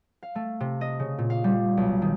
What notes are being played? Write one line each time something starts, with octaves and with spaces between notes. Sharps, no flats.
F5
A3
C3
D#5
C#3
A#2
F5
G3
B1
D#3